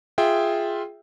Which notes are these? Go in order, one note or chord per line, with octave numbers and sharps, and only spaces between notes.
F4 G#4 E5 G5